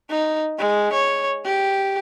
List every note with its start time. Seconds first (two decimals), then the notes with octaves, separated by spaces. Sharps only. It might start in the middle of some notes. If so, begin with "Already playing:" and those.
0.10 D#4
0.58 G#3
0.93 C#5
1.45 G4